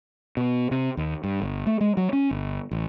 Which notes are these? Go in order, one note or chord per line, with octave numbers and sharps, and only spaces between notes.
B2
C3
D#2
G2
G1
A3
G#3
F#3
C#4
G1
A1